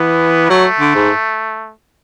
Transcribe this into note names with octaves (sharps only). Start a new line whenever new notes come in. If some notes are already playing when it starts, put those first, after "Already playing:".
Already playing: E3 B3
F#3 A3
D3
G#2